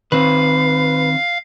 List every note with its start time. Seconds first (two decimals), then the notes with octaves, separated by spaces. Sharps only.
0.12 D#3 C4 B4 F5